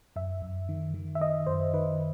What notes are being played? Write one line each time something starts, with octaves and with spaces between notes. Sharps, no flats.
F#2 E5
F#2
D#3
D#3
E5
D#3 D#5
F#2 C5
D#3 B4